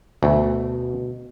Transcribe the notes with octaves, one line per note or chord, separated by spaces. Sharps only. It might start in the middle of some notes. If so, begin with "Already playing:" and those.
D2 B2 A3